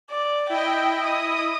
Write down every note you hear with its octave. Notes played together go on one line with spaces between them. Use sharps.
D5
E4 D#5 G5
D#6